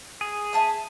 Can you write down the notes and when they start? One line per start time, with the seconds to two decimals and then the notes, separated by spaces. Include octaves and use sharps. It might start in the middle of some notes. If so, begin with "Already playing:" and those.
0.21 G#4
0.53 E5 A5 D#6